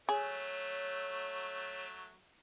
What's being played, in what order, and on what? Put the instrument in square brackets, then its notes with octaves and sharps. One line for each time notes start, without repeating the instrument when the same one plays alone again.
[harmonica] F#3 A3 [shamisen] G#4 [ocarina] C#5